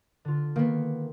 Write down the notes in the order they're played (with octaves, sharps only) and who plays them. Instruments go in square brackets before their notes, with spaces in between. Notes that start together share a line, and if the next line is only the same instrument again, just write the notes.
[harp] D3 F4
[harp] D#3 [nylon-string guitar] A#3 B3